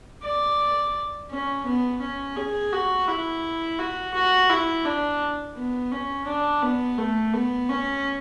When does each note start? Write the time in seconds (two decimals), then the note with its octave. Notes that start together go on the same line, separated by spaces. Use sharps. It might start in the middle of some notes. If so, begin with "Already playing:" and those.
0.23 D5
1.31 C#4
1.66 B3
2.01 C#4
2.37 G#4
2.73 F#4
3.08 E4
3.79 F#4
4.14 F#4
4.50 E4
4.85 D4
5.57 B3
5.92 C#4
6.27 D4
6.62 B3
6.98 A3
7.33 B3
7.69 C#4